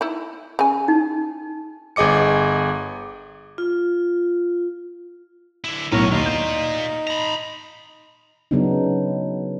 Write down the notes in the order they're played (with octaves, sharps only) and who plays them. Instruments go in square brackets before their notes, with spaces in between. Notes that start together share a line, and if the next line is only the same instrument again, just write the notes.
[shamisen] D#4 E4
C#3 G#5
[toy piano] D#4
[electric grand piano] G1 G#4 D#5 D6 C#7
[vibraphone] F4
[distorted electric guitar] D3 E4
[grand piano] B1 A2 [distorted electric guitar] B3 C#5 [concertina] A#4
[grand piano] D#2 [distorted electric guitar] A#2 F4 [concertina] D#4
[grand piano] G6
[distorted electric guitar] A#5 B5
[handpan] C#3 F#3 B3 D4 D#4